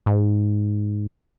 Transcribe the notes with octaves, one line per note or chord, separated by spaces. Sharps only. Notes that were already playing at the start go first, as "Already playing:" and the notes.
G#2